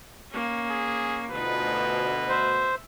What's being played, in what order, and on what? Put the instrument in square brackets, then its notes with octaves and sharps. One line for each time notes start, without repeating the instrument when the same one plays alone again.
[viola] A#3 C#4
[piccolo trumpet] G#4
[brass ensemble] D2 B2 [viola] D#4 F4 [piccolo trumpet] B4
[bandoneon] C5 [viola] E5